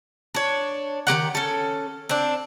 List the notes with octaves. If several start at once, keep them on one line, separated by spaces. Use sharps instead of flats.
D4 C#5
D#3 C4 G4 F#5
C#4 A4
C4 D4